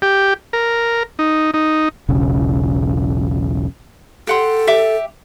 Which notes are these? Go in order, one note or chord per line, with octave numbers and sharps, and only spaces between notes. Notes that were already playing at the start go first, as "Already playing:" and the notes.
G4
A#4
D#4
D#4
E1 B1 C#3
G4 A4 F#5 C6
G4 E5 D6